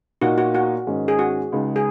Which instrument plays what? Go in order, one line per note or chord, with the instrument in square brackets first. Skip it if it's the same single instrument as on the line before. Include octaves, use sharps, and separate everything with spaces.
[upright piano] A#2 A#3 D#4 [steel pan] F#4
[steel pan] F#4
F#4
[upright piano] G#2 D#3 G#3 C#4
[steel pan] G#4
F#4
[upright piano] C#2 C#3 G#3 D#4
[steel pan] G#4